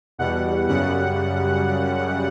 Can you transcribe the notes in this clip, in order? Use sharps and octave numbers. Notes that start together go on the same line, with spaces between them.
E2 B2 G3 F#5
F#2 C#3 G3 F#5